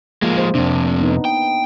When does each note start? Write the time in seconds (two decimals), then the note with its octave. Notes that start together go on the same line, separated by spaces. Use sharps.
0.22 F3 G#3 A#3
0.38 C5
0.55 F2 C3 D4
1.01 B3 D#4
1.25 G5